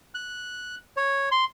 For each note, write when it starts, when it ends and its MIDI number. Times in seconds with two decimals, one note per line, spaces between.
0.15 0.76 90
0.97 1.29 73
1.31 1.45 84